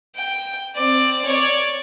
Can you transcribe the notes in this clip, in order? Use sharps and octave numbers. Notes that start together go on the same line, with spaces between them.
G5
C4 D5
C#5 D5